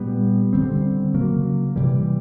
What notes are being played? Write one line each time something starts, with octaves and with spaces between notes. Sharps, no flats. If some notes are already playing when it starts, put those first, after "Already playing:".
Already playing: A#2 G3 B3
D3 G3 C4
C#3 F#3 A#3
C3 E3 G3